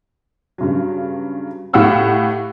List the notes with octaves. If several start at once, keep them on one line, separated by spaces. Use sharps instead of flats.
G2 C#3 F#3
A2 G4 F5 F#5 E6 F6